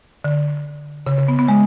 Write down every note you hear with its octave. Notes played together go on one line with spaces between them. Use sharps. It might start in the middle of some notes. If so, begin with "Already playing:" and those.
D3
C#3
C#3
B3
B3
G#3